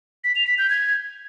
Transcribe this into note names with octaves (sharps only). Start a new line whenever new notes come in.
B6
F7
B6
G6
G#6